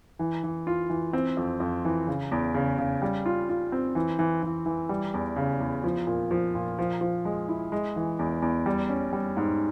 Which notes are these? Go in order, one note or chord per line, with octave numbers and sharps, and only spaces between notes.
E3
E3
F4
E3
C4
F2
F2
E3
C#3
E2
C#3
C#3
G3
F4
F4
C4
E3
E3
E3
E3
G3
E2
C#3
E2
F3
A#2
F3
A#2
F3
F3
G#3
E4
G#3
E3
E2
E2
G3
C#4
G3
G#2